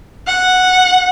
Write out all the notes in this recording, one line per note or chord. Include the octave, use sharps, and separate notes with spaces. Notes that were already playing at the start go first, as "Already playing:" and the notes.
F#5